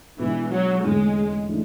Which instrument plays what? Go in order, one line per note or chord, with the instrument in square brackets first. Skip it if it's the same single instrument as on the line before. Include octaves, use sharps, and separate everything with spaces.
[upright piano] B2 G#3 D4 [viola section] E3
[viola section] F#3
[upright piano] E2 D3 A3 C#4 G#4 [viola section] G#3
[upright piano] E3 A3 D4